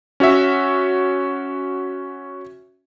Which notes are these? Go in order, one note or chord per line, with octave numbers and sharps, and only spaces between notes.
C#4 F#4 C#5 E5